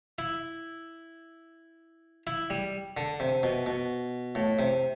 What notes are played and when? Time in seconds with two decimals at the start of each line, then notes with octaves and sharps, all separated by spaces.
0.18 E4
2.27 E4
2.50 G3
2.97 D3
3.20 C3
3.43 B2
3.66 B2
4.35 A2
4.59 C3